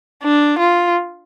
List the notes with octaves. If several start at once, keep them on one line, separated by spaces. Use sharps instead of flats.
D4
F4